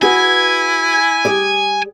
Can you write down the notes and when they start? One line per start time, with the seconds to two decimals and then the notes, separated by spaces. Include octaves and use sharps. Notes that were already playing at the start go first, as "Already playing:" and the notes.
0.02 E4 F#4 G#4 B4 G#5
1.25 G3 G#4 D5